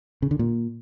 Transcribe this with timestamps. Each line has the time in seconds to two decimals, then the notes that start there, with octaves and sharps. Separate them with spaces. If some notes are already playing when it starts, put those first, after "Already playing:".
0.22 C#3
0.31 D3
0.39 A#2